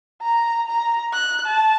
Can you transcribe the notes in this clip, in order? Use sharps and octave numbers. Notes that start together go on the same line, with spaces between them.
A#5
A#5
F#6
A5